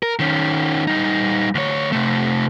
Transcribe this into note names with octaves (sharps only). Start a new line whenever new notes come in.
A#4
D#3 C#4
G3 D#4
D2 C#5
C3 A3